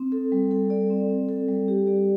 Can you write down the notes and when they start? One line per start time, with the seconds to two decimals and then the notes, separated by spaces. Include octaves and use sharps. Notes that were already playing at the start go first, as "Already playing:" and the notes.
Already playing: C4
0.12 A4
0.32 G3
0.51 A4
0.70 D5
0.90 C4
1.09 C4
1.29 A4
1.48 G3
1.68 G4
1.87 D5